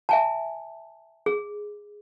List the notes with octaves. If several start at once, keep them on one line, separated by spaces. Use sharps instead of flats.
E5 G#5 A5
G#4